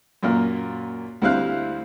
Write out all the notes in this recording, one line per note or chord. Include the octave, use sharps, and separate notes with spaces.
F#2 A#2 A#3 F6
D2 G3 C4 E4 F5 F#6